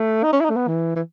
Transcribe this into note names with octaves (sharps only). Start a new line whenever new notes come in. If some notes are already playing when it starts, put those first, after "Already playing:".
Already playing: A3
D#4
C#4
E4
D#4
A3
B3
E3
E3